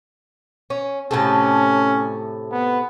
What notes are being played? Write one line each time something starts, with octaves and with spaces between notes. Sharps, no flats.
C#4
A2 C3 C#4 A4
B3